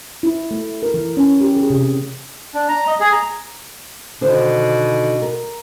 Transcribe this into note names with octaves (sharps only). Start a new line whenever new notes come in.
E4
A3
A#4
E3
C#4
G4
G#4
C3
D4
A#5
D#5
G#4
A#5
B2 D3 D#3 C5
A#4